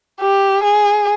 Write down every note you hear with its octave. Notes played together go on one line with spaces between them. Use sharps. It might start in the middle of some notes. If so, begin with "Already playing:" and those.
G4
G#4